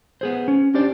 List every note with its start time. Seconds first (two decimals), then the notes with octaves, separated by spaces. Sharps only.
0.21 B3 G#4 C5
0.48 C#4
0.74 C#4 D4 G4 C5 D5